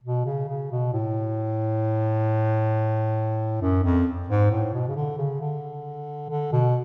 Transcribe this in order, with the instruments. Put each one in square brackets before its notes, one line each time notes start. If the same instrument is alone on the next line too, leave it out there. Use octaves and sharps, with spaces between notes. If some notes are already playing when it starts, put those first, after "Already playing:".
[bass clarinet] B2
C#3
C#3
B2
A2
F#2
F2
G#2
A2
B2
C#3
D3
C#3
D3
D3
B2